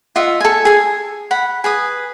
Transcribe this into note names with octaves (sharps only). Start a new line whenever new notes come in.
F4 D#5 E5 F#5
A4 G#5
G#4 G#5
F#5 B5
G#4 B4 D#6